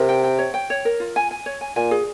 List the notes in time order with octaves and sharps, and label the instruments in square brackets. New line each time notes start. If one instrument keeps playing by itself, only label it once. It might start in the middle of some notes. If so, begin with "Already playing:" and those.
Already playing: [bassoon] C3 [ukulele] A#4
[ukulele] G5
G5
C#5
G5
C#5
A#4
F4
G#5
G#5
C#5
G#5
[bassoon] A#2 [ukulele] G#5
[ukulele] G#4